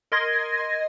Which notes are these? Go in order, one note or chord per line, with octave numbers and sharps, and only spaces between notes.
A#4 D#5 C6 G#6 A#6